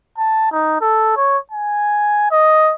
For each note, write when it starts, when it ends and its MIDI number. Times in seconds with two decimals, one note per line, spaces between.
0.18 0.52 81
0.52 0.77 63
0.81 1.14 69
1.17 1.38 73
1.51 2.28 80
2.31 2.74 75